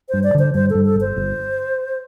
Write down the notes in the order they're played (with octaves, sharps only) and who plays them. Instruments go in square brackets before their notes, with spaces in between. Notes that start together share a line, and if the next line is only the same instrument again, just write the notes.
[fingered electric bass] G2 [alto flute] C5
[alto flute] D5
[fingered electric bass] D3 [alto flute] C5
[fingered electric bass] G2 [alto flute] C5
[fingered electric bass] G2 [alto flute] A4
[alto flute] A4
[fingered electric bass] G1
[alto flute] C5
[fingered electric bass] G1